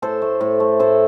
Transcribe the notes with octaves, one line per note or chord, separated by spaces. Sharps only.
A2 A4 C5
A3
A2
A3
A2 A4 C5